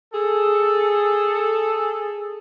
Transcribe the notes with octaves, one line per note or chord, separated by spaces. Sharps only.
G#4 A4